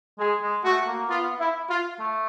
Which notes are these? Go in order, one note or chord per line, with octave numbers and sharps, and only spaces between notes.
G#3 G#4
G#3
A3 F#4
A#3
B3 F4
E4
F4
A3